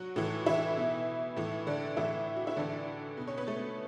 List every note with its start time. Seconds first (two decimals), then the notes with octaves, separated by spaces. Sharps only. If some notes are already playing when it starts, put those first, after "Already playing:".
Already playing: F#3 F#4
0.16 A2 E3
0.46 E3 E4
0.77 B2
1.37 A2 E3
1.67 D3 D4
1.97 A2 E3 E4
2.36 F#4
2.47 E4
2.57 A2 D3 E3 D4
3.17 B2
3.27 C#4 C#5
3.37 B3 B4
3.47 A3 A4